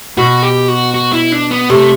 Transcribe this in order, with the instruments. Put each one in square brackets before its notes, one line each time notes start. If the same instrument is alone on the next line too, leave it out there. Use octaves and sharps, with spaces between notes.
[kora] B2 [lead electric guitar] F#4
[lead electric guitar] G4
F#4
F#4
E4
D4
B3
[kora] C3 [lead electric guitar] A3